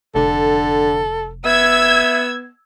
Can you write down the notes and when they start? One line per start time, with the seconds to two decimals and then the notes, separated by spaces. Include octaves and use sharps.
0.15 F1 D3 A4
1.45 B3 E5 E6 G#6